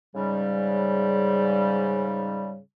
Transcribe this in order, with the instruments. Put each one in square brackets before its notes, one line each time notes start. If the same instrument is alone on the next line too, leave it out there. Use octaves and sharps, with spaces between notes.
[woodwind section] G#2 C#3 G3